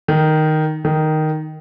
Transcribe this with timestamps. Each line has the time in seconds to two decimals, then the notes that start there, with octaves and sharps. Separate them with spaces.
0.08 D#3
0.85 D#3